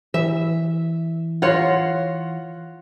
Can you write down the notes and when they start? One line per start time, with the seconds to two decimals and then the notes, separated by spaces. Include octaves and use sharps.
0.14 E3 E5
1.42 F4 C#5 F#5 C6 A#6